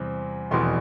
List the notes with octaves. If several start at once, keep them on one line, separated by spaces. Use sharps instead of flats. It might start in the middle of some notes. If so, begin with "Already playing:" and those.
Already playing: E2 C3 G3 C4
F1 E2 B2 C6